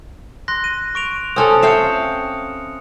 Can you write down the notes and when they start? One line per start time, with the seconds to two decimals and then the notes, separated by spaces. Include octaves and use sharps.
0.48 C6 F#6 A#6
0.64 D#7
0.95 C#6 D7 F7
1.36 C4 C#4 A4 D#6 F6 F7
1.63 E5 F5 G5 C#7 E7